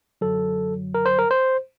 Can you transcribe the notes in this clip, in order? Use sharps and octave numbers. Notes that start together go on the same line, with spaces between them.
F#2 D3 F#3 A4
A#4
C5
A#4
C5